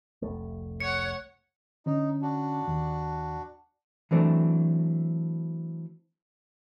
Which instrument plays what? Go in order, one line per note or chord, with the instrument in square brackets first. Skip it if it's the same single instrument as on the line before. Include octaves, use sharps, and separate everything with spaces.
[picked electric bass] F1 C2 A3
[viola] C#5 F#5 [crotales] C#7
[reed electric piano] D3 C#4 [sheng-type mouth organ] D#4
[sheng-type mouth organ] D4 F#4
[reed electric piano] D#2
[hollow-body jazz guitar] E3 F#3 A3 C4 D4